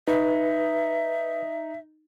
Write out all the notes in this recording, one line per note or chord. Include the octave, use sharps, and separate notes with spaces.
D#4 B4 E5